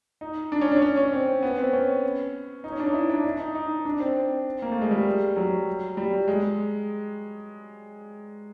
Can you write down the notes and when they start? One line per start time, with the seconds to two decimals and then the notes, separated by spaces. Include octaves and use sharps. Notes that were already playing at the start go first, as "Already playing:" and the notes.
0.21 D#4
0.52 D4
0.61 C#4
0.72 D4
0.82 C#4
0.97 C#4
1.12 C4
1.43 B3
1.58 C4
1.73 C#4
2.64 D#4
2.72 C#4
2.80 D4
2.86 D#4
2.94 E4
3.10 D4
3.24 D4
3.39 D#4
3.55 D#4
3.85 D4
4.00 C4
4.62 A#3
4.72 A3
4.82 G#3
4.91 G3
5.36 F#3
5.97 G3
6.28 G#3